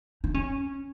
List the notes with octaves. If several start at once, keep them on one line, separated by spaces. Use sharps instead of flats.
D#4
C#4